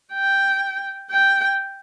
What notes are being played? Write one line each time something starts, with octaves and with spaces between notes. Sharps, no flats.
G5
G5